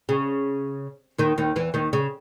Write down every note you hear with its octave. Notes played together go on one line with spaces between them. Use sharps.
C#3
D#2 D#3
D#2 D#3
E2 E3
D#2 D#3
C#3